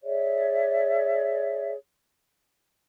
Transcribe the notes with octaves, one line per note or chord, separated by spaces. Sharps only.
G#4 C#5 D5 E5